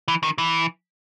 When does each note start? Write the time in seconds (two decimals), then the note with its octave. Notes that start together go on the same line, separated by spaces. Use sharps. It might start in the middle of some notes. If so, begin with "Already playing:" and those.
0.08 E3
0.23 D#3
0.38 E3